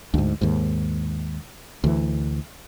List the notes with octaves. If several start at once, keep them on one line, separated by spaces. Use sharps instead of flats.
D2 G#2
D#2 G#2
D2 E3